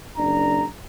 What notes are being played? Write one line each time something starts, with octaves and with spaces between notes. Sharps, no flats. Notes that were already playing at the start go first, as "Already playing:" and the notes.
F#1 D4 A#5